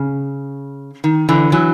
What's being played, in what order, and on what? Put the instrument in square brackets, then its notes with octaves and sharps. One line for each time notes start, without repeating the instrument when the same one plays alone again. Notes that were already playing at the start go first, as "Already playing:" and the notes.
Already playing: [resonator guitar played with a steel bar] C#3
D#3
D3 E3
E3 F#3